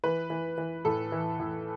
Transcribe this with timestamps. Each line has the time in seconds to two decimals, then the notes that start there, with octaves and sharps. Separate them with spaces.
0.04 E3 B4
0.30 E3
0.58 E3
0.85 A2 A4
1.12 E3
1.40 A2